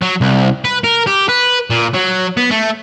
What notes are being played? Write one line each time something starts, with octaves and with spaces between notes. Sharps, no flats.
F#3
C2
B4
A#4
G4
B4
A#2
F#3
B3
A3